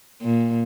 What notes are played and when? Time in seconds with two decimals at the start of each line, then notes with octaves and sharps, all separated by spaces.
0.22 A#2